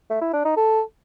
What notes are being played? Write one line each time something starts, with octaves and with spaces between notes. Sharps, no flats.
A3
E4
D4
D#4
A4